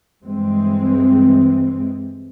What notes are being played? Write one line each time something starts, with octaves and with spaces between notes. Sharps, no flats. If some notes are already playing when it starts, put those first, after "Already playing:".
G2 E3 G#3 C4